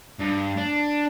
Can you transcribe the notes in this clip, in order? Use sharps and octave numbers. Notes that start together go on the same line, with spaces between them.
G2
D4